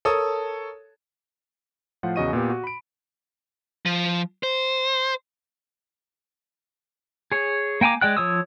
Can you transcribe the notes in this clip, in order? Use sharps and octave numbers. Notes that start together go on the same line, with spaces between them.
A4 A#4 C#5 A5 D#6
A2 F3 F4 C5 F#5
E2 C#3 F#4 D#5 C#6 D#7
A#2 B3 G4
F#4
B5 D7
F3
C5
G#4 C#5
A#3 G5 G#5 A#5 D6
G#3 D5 G5 F#6
F3 C#5 D#6 E6